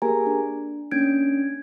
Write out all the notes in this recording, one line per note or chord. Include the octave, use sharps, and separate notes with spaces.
A#3 G4 G#4 A#4 G#5 A#5
D4
A#3 C#4 D4 G6 G#6 D7